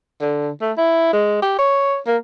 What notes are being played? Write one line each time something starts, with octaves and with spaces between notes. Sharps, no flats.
D3
A3
E4
G#3
G4
C#5
A#3